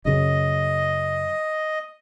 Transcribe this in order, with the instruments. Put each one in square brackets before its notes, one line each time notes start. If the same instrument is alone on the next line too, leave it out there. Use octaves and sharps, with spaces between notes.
[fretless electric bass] F#2 C#3 [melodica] D#5